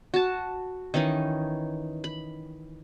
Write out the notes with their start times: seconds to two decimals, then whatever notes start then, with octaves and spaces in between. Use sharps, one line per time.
0.14 F#4 A5
0.94 D#3 E3 C#4 D#4
2.04 B5